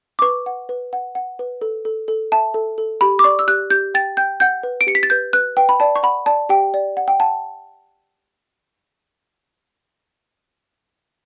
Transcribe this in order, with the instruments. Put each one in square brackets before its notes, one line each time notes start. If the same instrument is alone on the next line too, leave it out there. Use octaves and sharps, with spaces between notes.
[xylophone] D6
B4 C#6
F#5
B4
F#5
F#5
B4
A4
A4
A4
E5 A5
A4
A4
G4 B5
D6
D5 C#6
E6
G4 F#6
G4 G6
G5 A6
G5 G6
F#5 G6
B4
D7
G4 C#7
B6
A6
B4 G6
B4 F#6
B4 G5
B5
D5 A5
C#6
F#5 B5
D5 A5
G4 G5
D5
F#5
G5
F#5 A5